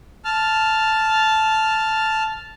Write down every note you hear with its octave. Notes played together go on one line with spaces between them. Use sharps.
A5 F6